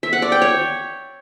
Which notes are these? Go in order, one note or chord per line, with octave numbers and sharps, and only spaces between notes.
E5
F#5
D5
G5
C#5